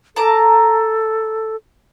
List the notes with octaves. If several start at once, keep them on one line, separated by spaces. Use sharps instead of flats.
A4 A5 A#5 D6